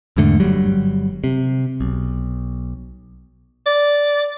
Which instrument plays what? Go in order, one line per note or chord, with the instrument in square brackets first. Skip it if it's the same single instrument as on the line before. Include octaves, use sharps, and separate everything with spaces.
[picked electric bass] E2 G#2 D3 A3
G1 F#3 G3
C3
B1
[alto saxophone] D5